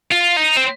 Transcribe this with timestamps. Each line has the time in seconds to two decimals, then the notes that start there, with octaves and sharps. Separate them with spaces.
0.12 F4
0.37 D#4
0.57 C4